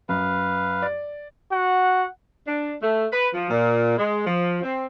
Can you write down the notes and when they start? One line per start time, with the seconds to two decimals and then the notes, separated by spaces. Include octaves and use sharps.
0.09 F#2 B4 F5
0.82 D5
1.52 F#4 F#5
2.46 D4
2.81 A3
3.13 B4
3.34 F3
3.50 A#2
3.98 G#3
4.27 F3
4.62 C4